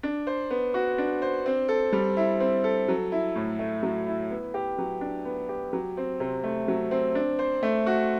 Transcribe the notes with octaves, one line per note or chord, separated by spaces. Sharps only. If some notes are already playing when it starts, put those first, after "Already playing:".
D4
C5
B3
F#4
D4
C5
C4
A4
G3
E4
C4
A4
F#3
E4
A2
A3
F#3
E4
B3
G4
F#3
D4
B3
G4
F#3
C4
C3
A3
F#3
C4
D4
C5
A3
F#4